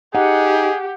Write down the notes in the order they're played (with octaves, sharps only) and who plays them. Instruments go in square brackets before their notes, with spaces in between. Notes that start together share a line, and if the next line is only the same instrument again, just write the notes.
[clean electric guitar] D#4 [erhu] G4 [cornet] G#4 [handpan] F#5